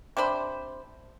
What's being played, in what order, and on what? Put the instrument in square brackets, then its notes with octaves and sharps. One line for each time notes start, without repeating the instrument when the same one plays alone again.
[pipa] C3 D4 C5 B5